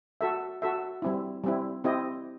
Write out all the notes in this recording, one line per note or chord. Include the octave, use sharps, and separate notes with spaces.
F#4 A4 E5
F#4 A4 E5
G3 C4 E4
G3 C4 E4
C4 E4 G4 D#5